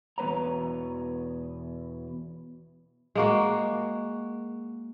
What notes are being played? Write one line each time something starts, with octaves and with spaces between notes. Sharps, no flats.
E2 B2 A#3 B4 C#5 A#5
G#3 A#3 F#4